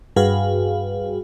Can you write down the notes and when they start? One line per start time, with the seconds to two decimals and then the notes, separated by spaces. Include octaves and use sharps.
0.16 G2 F#4 G#4 B4 F5